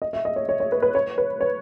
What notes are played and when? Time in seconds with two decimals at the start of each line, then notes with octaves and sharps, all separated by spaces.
0.02 D#5
0.13 E5
0.25 D#5
0.36 C#5
0.49 C#5
0.60 C#5
0.72 B4
0.82 B4
0.95 C#5
1.18 B4
1.41 C#5